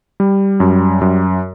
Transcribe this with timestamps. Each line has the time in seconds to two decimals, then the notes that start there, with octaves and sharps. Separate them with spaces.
0.20 G3
0.60 F#2
1.01 F#2